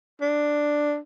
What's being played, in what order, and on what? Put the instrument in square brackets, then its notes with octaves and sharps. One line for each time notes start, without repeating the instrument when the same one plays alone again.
[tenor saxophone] D4